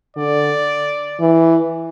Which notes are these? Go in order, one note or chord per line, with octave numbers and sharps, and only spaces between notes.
D3 D5
E3